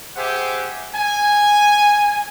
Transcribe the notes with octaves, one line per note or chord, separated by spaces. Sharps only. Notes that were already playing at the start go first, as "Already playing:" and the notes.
G4 G#4 C5 E5 F#5 G#5
G#5